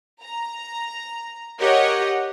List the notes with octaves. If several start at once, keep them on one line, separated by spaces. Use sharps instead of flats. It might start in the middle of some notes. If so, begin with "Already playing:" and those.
A#5
G4 A#4 C#5 D#5 F#5